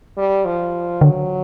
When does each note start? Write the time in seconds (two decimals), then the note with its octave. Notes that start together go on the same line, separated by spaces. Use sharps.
0.17 G3
0.45 F3
1.01 D3 F#3